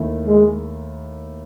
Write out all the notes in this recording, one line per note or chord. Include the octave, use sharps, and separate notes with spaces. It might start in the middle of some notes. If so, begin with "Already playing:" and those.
Already playing: D#2 D#3 A3 E4 A4
G#3